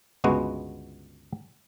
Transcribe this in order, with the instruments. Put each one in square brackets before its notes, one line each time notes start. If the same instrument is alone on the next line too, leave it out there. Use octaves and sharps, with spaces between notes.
[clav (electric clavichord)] G1 C#2 G#3 B3 F#4